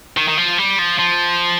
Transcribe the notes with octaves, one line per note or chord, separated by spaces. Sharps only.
D#3
D#3
F3
G3
F3
F3